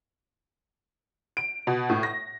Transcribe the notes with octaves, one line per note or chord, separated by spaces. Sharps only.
D7
B2
A2
A#6